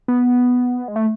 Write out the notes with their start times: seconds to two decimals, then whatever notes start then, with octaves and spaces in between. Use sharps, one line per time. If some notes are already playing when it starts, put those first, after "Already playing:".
0.08 B3
0.88 G#3
0.96 A3